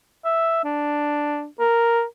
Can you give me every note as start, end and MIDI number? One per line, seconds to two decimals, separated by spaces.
0.25 0.61 76
0.65 1.45 62
1.60 2.03 70